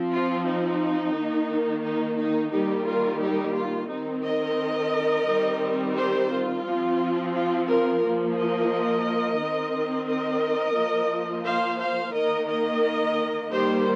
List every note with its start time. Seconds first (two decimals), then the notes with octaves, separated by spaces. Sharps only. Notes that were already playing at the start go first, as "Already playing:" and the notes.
Already playing: F3 C4
0.13 F4
0.47 D#4
1.15 D#3 A#3
1.84 D#4
2.18 D#4
2.52 D#3 G3 A#3 D#4 G4
2.87 F4 A#4
3.21 D#4 G4
3.56 F4
3.90 D#3 C4 D#4
4.24 A#4 D#5
5.27 D#3 G3 C4
5.96 G4 C5
6.30 F4
6.64 F3 C4
7.33 F4
7.68 F4 A#4
8.02 F3 A#3
8.36 A#4 D#5
9.39 D#3 C4
10.07 A#4 D#5
10.76 F3 A#3
11.45 C5 F5
11.80 C5 F5
12.14 D#3 A#3 A#4 D#5
12.48 A#4 D#5
13.50 D#3 G3 A#3 G4 C5